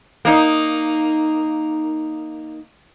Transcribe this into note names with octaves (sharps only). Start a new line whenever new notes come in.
A#3 D#4